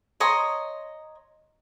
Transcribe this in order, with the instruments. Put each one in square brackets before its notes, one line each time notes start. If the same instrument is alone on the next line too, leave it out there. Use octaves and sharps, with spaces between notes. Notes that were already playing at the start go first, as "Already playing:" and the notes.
[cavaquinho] C#5 D#5 A#5 C6